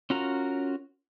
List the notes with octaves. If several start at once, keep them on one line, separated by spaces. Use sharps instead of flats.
C#4 F4 F#4 A#4 A#5